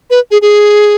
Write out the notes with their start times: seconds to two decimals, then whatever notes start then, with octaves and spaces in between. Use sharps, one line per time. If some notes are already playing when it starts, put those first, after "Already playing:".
0.10 B4
0.31 G#4
0.42 G#4